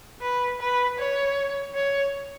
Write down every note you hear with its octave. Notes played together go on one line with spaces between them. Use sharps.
B4
B4
C#5
C#5